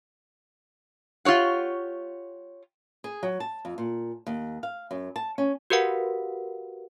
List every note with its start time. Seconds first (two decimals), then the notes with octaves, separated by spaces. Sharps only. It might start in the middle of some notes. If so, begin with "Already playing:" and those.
1.25 F4 G4 C#5 F#5
3.04 G#4
3.23 F#3
3.40 A5
3.65 F2
3.78 A#2
4.27 D#2
4.63 F5
4.91 F#2
5.16 A5
5.38 C#4
5.70 F#4 G4 A#4 B4 F5 F#5